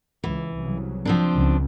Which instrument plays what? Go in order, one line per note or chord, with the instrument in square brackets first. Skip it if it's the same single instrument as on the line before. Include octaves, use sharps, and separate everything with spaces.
[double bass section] C#2 [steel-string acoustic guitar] E3
[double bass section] C2 C#3 F#3
[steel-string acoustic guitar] F3 C4 D4
[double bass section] C#2